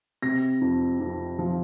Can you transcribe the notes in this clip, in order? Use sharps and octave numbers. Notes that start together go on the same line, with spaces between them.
C3 A#6
F2
F2
F3